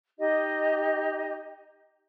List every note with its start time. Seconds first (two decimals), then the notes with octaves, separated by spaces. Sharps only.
0.18 D#4 G4 D#5